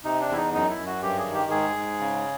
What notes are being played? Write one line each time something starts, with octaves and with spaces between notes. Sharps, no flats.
C3 D#4
D4
E2 E4
D#4
F#2 D#4
E4
F#2
F#4
G2 G4
G#4
D#3
G4
G#2 G#4
G#2
C#3